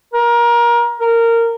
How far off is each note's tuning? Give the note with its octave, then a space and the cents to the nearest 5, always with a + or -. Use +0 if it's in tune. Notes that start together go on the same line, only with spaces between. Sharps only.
A#4 +25
A#4 -15